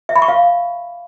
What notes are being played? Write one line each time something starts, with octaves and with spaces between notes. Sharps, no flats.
E5
B5
C#6
F5